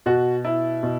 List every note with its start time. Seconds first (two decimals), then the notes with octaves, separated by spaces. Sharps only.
0.06 B2 F#4
0.45 E4
0.83 B2